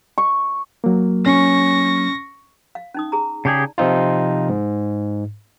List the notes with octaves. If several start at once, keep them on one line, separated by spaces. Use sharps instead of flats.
C#6
F#3 A#3
C#4 C#6 A#6
F5
C#4 D#4 D#6
G#4 A#5
C#3 G4 G#4 D5 A5
C3 F3 C4 D#4 F4
G#2